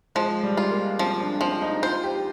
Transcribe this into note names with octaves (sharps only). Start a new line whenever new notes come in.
F3 G#3
G3
F4
A#3
F3 C4
D4
F3 C4
D#4
F4 C5
G4